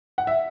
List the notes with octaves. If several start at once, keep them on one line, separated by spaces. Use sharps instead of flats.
F#5
E5